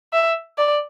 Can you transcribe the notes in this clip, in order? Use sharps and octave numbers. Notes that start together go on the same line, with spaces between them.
E5
D5